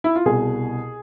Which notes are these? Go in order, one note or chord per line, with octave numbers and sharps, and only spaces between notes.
E4
F4
C2 B2 G#4